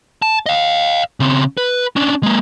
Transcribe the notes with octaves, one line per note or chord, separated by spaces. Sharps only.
A5
D#5 F5
C#3 C4
B4
C#4 D4
G#3 A#3